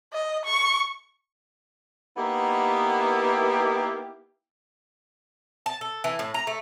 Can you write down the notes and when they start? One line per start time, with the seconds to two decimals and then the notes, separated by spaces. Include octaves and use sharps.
0.13 D#5
0.45 C#6
2.17 A#3 B3 D#4 E4 G4 B4
5.66 A5
5.81 A4
6.04 E3
6.19 A2
6.34 A#5
6.47 A3